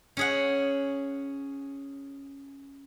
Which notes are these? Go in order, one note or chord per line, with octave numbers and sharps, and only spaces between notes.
C#4 G#4 F#5